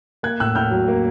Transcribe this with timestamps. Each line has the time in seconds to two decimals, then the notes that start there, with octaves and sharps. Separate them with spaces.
0.23 A#3 F#6 G#6
0.40 A2 E6 F#6
0.55 A2 F6 G6
0.71 F#3
0.88 A#3